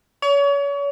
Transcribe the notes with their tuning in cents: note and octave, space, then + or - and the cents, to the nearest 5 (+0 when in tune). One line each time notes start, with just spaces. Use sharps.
C#5 +35